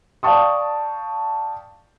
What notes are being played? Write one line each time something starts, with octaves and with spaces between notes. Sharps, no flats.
D5 F5 G5 A5 C#6 D#6